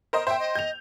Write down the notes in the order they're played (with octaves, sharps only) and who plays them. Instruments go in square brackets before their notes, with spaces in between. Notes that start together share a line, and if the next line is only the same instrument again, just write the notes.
[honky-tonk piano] A#4 C5 D#5
[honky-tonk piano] C5 G5 [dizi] E5
[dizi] D#5
[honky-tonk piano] G6 F7